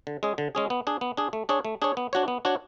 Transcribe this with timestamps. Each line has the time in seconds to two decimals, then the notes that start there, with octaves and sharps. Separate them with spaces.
0.07 D3
0.23 G#3 C#4 G#4
0.38 D3
0.55 G#3 C#4 G#4
0.70 B3
0.87 D4 G#4
1.01 B3
1.17 D4 G#4
1.33 A3
1.49 D4 G#4 C#5
1.65 A3
1.82 D4 G#4 C#5
1.97 B3
2.13 D4 F#4 C#5
2.28 B3
2.45 D4 F#4 C#5